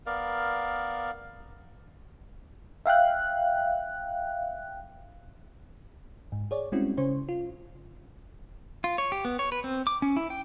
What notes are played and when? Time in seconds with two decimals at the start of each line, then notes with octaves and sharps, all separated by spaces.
0.06 B3 A#4 D5 F5
2.86 E5 F5 G5 F#6
6.32 G#2
6.51 G#4 C#5 D5
6.72 G3 G#3 C4 C#4 E4 F#4
6.97 C#3 C#4 C5 C#5
7.29 F4
8.84 F4
8.98 C#5
9.12 G4
9.25 B3
9.39 C#5
9.52 B4
9.64 C4
9.87 D6
10.02 C#4
10.17 E4
10.30 G5